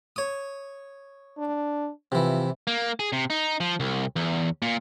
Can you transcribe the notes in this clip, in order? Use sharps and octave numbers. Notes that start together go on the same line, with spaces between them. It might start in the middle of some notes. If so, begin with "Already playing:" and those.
C#5 D#6
D4
C3 E3 F3
A#3
G#4
C3
D#4
F3
C2
E2
A#2